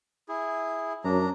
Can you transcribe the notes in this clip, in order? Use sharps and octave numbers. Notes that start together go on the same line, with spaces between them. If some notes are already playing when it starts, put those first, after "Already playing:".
E4 G#4
F#2 F#3 D4 A#5